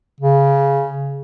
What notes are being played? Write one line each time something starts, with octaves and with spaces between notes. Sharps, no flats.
C#3